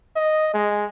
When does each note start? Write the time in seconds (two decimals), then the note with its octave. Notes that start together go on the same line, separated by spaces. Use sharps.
0.16 D#5
0.54 G#3